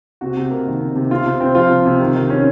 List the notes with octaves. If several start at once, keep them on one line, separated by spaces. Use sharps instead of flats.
C3 F#4
C3
A#3
D#3
C3
C3
C3 F4
C3
C4
F3 F4
C3
C3
D#3
D#3
C#4